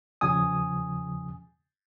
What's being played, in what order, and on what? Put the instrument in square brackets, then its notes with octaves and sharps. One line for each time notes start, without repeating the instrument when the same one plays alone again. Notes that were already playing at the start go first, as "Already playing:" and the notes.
[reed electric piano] E2 C#3 F3 G#5 D#6